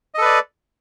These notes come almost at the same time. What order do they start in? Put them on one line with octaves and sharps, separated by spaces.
D#5 A4 B4 D5